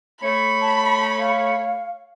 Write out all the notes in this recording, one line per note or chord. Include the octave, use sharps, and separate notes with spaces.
A3 C#5 B5
A5
F5